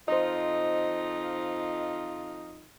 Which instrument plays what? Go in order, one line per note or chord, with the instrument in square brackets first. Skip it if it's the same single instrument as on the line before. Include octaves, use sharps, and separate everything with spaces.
[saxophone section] F2 D#4 F4 [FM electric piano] C5 D#5